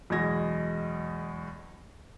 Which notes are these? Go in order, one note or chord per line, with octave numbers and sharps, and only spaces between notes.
E2 B2 F#3 G#3 G#6 A#6